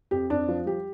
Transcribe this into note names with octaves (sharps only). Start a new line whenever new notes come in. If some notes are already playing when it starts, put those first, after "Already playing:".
F2 G4
F2 D4
F3
G3 G4